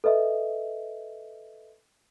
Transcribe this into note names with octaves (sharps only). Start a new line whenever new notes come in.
A4 B4 D#5 E5